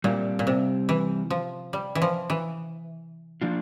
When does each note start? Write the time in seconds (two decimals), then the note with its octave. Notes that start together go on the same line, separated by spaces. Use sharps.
0.04 A#2 G3 C4 E4 G4
0.39 A#2
0.47 C3
0.89 E3
1.30 F3
1.73 G3
1.95 E3
2.02 F3
2.30 E3
3.42 F3 A#3 D4 F4